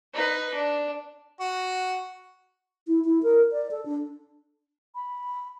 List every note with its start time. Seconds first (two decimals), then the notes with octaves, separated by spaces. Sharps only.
0.14 D#4 B4
0.54 D4
1.40 F#4
2.88 E4
3.05 E4
3.23 A#4
3.52 D5
3.71 A4
3.85 D4
4.95 B5